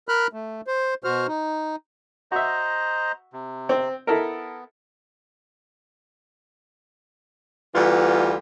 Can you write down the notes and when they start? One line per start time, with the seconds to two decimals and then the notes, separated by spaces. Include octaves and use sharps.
0.09 A#4 B5 F6 F#6
0.33 A3
0.67 C5
1.04 B2 F#4 C5 F6
1.28 D#4
2.32 F#4 C5 D#5 E5 A#5
3.33 C3
3.69 C4
4.07 B3 E4 A4 A#4
7.74 D2 E3 G3 B3 F4